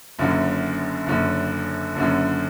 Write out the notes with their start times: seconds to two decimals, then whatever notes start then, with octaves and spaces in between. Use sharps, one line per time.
0.19 F#1 F#2 D3
1.06 F#1 F#2 D3
1.96 F#1 F#2 D3